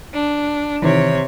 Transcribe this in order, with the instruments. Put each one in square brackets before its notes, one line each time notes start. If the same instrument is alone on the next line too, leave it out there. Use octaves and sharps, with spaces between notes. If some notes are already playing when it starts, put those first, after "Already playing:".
[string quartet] D4
[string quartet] C3 C#5 [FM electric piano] D#3 E3